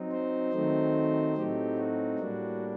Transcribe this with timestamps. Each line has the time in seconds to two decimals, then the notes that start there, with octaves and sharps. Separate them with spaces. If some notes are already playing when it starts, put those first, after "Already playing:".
Already playing: F#3 C4 D#4
0.12 C5
0.53 D#3 F#3 A3 C4 D#4
1.36 A2 F#3 A3 C4 D#4 G4
1.77 F#4
2.19 A2 G3 A#3 D4